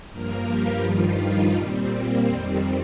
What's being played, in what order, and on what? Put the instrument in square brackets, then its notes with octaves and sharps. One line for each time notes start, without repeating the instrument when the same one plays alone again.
[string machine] G2 F3 A#3 A#4
G3 G4
G2 D#3 F3 G3 F4
D#3 D#4
A#2 G3 C4
A#3
F2 D#3 G3 C4